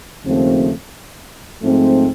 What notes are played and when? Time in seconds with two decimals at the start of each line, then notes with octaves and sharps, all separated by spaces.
0.24 D#2 C#3 F3 A3 C4
1.61 G#2 F3 A3 C4